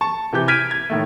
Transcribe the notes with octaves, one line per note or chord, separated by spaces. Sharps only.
A5 C#6
C3 E3 G4 G6
F6 G#6 B6 D7 D#7
G#6
A2 D#3 A3